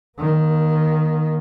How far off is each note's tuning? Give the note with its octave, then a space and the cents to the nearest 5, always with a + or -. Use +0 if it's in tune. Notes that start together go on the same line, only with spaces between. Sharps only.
D#3 +0 A#3 +40